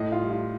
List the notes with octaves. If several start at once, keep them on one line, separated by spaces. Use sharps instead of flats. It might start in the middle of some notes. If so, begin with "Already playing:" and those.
Already playing: A2 D#5
F4
G3
F4